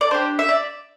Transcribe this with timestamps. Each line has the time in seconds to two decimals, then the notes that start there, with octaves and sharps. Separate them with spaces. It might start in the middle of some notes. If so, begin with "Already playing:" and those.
0.01 D5
0.11 D4 G4 C5
0.39 E5
0.49 D5